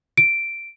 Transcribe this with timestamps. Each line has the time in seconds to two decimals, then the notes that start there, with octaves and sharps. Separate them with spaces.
0.18 D7